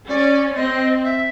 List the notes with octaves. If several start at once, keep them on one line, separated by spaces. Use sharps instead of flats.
C#4 D5
C4 D#5
E5